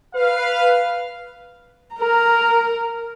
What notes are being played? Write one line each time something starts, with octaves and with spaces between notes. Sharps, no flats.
B4 F5
A#4 A#5